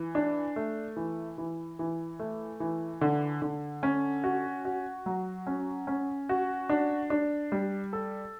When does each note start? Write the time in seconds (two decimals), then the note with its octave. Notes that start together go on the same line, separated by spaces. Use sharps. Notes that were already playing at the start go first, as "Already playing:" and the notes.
Already playing: E3
0.15 D4
0.56 A3
0.97 E3
1.38 E3
1.79 E3
2.20 A3
2.60 E3
3.01 D3
3.42 D3
3.83 C#4
4.24 F#4
4.65 F#4
5.06 F#3
5.47 C#4
5.87 C#4
6.29 F#4
6.69 D4
7.10 D4
7.52 G3
7.93 A4